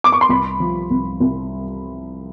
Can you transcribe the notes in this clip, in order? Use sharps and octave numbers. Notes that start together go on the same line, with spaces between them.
D6
C#6
C6
C2 B5
F3
C2
C2